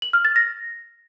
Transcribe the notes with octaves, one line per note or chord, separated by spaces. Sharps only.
F#7
F6
A6
A#6